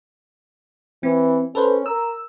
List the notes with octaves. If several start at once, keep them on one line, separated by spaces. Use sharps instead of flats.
E3 C4
C#4 A4 B4 C5
A#4 E6